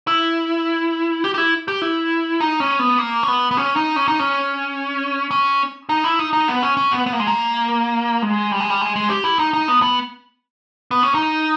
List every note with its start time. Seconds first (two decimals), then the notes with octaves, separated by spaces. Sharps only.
0.07 E4
1.24 G4
1.34 G4
1.38 E4
1.68 G4
1.82 E4
2.40 D#4
2.60 C#4
2.79 B3
2.98 A#3
3.23 C#4
3.28 B3
3.51 B3
3.57 C#4
3.76 D#4
3.96 C#4
4.08 D#4
4.19 C#4
5.31 C#4
5.89 D#4
6.04 E4
6.19 D#4
6.33 D#4
6.48 B3
6.63 C#4
6.77 C#4
6.91 B3
7.06 B3
7.13 A#3
7.20 G#3
7.27 A#3
8.22 G#3
8.52 G3
8.60 G#3
8.70 G3
8.81 G#3
8.96 G#3
9.09 G4
9.24 E4
9.39 D#4
9.53 D#4
9.68 B3
9.82 B3
10.91 B3
11.03 C#4
11.14 D#4